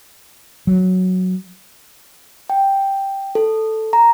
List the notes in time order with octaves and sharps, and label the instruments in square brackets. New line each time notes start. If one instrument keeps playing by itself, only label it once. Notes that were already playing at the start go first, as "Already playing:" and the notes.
[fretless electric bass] F#3
[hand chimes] G5
A4
A#5